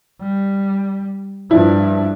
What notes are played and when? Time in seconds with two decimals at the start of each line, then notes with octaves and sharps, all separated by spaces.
0.21 G3
1.51 G2 F3 D4 E4